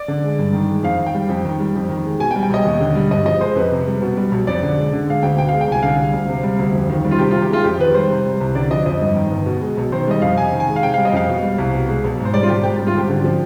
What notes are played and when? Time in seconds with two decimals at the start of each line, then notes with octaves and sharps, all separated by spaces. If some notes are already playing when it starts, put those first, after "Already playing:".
Already playing: D5
0.08 D3
0.23 G#3
0.39 G2
0.53 D#3
0.69 G#3
0.83 F2 F5
0.99 D#3
1.06 G5
1.14 G3
1.29 F2
1.45 D#3
1.60 G3
1.75 F2
1.89 D#3
2.05 G#3
2.19 B2 G#5
2.31 G5
2.36 G3
2.43 G5
2.50 B1 D#5
2.65 D#2
2.80 D3
2.95 G3
3.11 G2 D#5
3.25 F3 D#5
3.40 G#3 C5
3.56 F2 B4
3.71 C3
3.87 G3
4.02 B2
4.17 G3
4.32 B1
4.47 F2 D5
4.63 D3
4.78 G#3
4.93 D3
5.07 G#3 F5
5.23 D2 G5
5.38 B2 G5
5.49 G#3 F5
5.61 G5
5.68 C2 G#5
5.83 D3 F5
5.99 G3
6.13 D2
6.28 C3
6.43 G3
6.59 D2
6.74 F2
6.90 D#3
7.05 G3
7.11 F4
7.19 C3 G4
7.31 D#3 F4
7.42 G4
7.50 G#3 F4
7.64 F2 G4
7.80 D#3 B4
7.94 G3 C5
8.10 C3
8.26 G3
8.41 C2
8.55 D3 D5
8.71 F3 D#5
8.86 F2 D#5
9.01 G2
9.16 D#3
9.31 G1
9.46 B2
9.61 G#3
9.77 B1
9.92 D#3 C5
10.07 G3 D#5
10.22 F2 F5
10.38 C3 G#5
10.52 D#3
10.60 G#5
10.68 G#3
10.76 F5
10.83 C3 G5
10.94 G3 F5
11.05 D#5
11.13 F2 F5
11.28 B2
11.42 G3
11.58 C2
11.73 B2
11.88 G#3
12.04 B1
12.19 G#2
12.25 C5
12.34 G3 D5
12.43 F4
12.48 G#1 G4
12.63 G#2 G4
12.79 G3
12.87 F4
12.95 G#1 G4
13.09 D3
13.24 F3